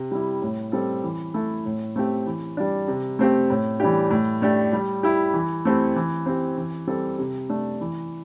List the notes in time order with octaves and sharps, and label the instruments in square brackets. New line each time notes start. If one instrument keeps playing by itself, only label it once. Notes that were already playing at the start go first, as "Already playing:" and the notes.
Already playing: [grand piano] C3
G3 E4
A2
G3 C4 A4
E3
A3 E4 A4
A2
A3 C4 G4
E3
G3 D4
C3
A3 C4 G4
A2
E3 G3 D4 G4
A2
A3 D4 G4
G3
E4 G4
E3
A3 C4 E4 G4
E3
C4 G4
E3
G3 C4 A4
C3
A3 D4
E3